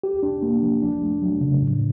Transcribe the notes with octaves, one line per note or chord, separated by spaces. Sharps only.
G4
D4
A#3
F3
D4
A3
F#3
C#3
A2